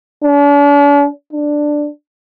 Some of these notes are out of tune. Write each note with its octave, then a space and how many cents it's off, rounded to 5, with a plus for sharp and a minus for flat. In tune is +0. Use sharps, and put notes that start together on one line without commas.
D4 -45
D4 +5